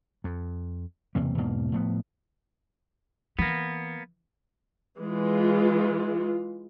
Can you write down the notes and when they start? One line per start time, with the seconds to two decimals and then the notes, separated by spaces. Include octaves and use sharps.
0.24 F2
1.15 F#1 E2 C3 A#3
1.38 E2 G#2 B2 A#3
1.72 A2 F3 B3
3.39 E3 A#3 B3
5.01 E3 G#3 F4